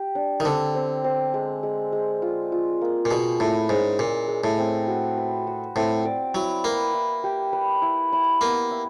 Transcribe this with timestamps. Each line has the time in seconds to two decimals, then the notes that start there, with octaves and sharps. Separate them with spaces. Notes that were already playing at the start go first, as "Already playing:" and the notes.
Already playing: G4
0.15 D4
0.40 D#3
0.45 D3 C4
0.75 C4
1.04 C4
1.34 G#3
1.63 G#3
1.92 G#3
2.22 F4
2.52 F4
2.81 A#3
3.05 A#2
3.11 B2 G#4
3.40 A2 E4
3.69 G#2 C#4
3.98 A#2 G#3
4.28 G#3
4.44 A2
4.58 C4
4.88 F#4
5.18 B4
5.47 F#4
5.76 A2 C4
6.05 D5
6.35 F#3 E4
6.64 A#3 B4
6.94 E4
7.24 G4
7.53 B4
7.82 E4
8.12 E4
8.41 A#3 B3
8.71 E4